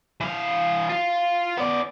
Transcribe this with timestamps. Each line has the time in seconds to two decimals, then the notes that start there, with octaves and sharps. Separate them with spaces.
0.20 E3 F5
0.89 F4 F5
1.57 B3 D5